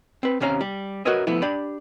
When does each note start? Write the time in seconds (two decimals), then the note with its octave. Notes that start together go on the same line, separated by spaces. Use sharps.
0.23 C4 B4
0.40 D#2 C3 C#4 F5 A#5
0.61 G3
1.05 F#4 A#4 B4 C#5 D#5 E5
1.27 F3 A3 B3 E4
1.42 D4 G4 D5 B5